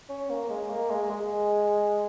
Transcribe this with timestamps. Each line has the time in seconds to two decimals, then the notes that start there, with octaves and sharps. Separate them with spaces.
0.09 C#4
0.30 A#3
0.50 G#3
0.70 A#3
0.91 G#3
1.10 G#3